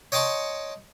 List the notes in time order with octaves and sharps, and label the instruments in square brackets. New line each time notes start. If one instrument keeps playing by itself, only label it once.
[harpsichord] C#5 D#5 G5 A5 C6 C#6